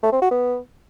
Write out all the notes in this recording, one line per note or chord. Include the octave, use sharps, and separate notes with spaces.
A3
C4
F#4
B3